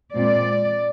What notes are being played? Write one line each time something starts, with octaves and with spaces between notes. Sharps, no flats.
A#2 G#3 C4 D5